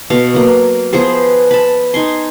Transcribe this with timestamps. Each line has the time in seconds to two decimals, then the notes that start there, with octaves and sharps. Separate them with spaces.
0.10 B2 A4 F5
0.34 F#3 A#3
0.93 F3 B3 G#4 C5
1.51 A5 B5
1.94 D#4 G#5 C6